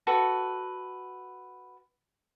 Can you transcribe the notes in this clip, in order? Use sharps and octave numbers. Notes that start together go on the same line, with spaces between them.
F#4 A4 B4